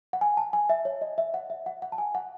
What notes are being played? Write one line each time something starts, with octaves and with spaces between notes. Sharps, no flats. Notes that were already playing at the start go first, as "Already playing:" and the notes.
F#5
G#5
A5
G#5
E5
C#5
D#5
E5
F#5
E5
F#5
F#5
A5
G#5
F#5